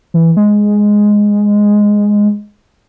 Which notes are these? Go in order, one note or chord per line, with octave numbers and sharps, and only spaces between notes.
E3
G#3